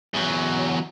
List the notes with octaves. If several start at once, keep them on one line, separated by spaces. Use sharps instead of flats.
E2 F#3